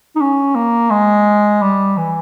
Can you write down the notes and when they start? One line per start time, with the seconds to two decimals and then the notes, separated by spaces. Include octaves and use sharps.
0.15 D#4
0.20 C#4
0.55 A#3
0.91 G#3
1.62 G3
1.97 E3